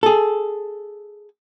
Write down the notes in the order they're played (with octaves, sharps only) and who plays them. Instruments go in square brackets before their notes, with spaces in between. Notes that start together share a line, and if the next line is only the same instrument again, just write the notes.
[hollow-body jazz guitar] G#4 A4